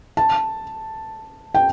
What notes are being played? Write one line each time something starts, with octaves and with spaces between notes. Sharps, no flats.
A5
G5